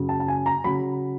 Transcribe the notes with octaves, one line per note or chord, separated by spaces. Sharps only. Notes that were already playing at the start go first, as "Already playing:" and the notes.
Already playing: F#2 C#3 F#3
A5
A5
G#5
A#5
C#3 F#3 B5